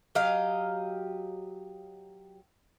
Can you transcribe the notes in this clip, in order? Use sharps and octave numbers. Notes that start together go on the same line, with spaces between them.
F#3 G4 D#5 F5